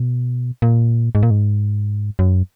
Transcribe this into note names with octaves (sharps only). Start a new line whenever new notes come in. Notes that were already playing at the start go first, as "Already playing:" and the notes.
Already playing: B2
A#2
G#2
A#2
G#2
F#2